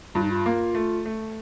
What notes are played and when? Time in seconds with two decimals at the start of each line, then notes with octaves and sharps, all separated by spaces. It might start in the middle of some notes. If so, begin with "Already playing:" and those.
0.15 G2 F4
0.23 D#4
0.31 F4
0.46 A#3
0.75 A3
1.06 A3